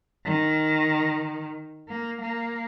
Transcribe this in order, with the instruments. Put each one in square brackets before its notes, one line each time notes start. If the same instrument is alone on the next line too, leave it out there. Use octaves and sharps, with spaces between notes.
[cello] D#3
A#3
A#3